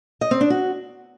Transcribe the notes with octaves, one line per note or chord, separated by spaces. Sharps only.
D#5
C4
D4
F#4